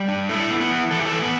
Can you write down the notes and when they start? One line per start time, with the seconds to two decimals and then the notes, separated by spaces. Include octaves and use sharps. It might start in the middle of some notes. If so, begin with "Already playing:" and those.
Already playing: G3
0.08 D4
0.29 A3 E4 A4
0.50 B3
0.60 B3 B4
0.71 E3
0.91 E3 A4
0.99 G4
1.05 A3 A4
1.13 E3
1.22 B3 B4